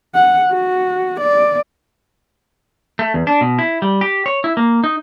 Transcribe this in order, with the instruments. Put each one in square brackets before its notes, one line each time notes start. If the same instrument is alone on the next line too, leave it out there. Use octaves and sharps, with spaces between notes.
[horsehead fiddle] F#5
F#4
D5
[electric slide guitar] A3
E2
D4
B2
E4
G3
G4
C#5
E4
A#3
D#4